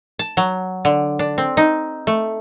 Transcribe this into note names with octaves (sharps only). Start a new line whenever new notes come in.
A5
F#3
D3
D4
C4
D#4
A3